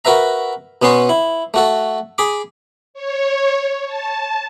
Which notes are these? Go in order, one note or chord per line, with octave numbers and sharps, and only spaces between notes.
F#4 A#4 B4 E5 A#5
B2 B3 C#4 C6 C#6
E4
A3 F#4 A4
G#4 B5 D6
C#5
A5